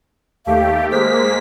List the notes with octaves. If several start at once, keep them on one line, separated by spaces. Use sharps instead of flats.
D#2 A3 G4 F5
G#3 A#3 C5 B6